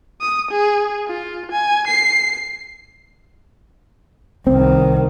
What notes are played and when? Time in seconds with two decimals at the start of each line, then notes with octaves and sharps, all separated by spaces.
0.21 D#6
0.51 G#4
1.07 F4
1.52 G#5
1.87 C7
4.47 C2 D#3 C4